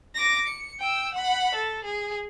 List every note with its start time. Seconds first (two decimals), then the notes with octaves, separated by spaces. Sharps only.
0.15 D6 A#6
0.48 C#7
0.80 G5 E6
1.15 F#5 B5
1.55 A4
1.85 G#4